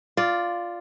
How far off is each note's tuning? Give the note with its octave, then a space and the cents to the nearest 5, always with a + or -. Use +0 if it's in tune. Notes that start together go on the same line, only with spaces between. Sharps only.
F4 +0 D5 +0